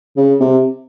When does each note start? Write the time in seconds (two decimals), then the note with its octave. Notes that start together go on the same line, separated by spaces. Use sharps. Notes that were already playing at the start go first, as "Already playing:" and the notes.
0.17 C#3
0.40 C3